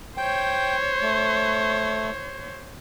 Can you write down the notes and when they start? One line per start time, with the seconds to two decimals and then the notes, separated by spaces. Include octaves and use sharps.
0.17 C5 C#5 G5
1.02 A3